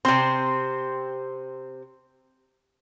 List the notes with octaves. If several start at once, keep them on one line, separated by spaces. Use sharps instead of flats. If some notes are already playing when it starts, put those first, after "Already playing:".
C3 C4 C6